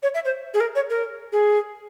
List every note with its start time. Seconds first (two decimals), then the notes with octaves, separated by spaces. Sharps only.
0.02 C#5
0.14 E5
0.24 C5
0.53 G#4
0.60 A#4
0.75 C#5
0.90 A#4
1.32 G#4